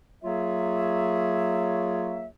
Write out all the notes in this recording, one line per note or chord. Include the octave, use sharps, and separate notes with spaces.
F#3 A#3 F4 G#4 C#5 E5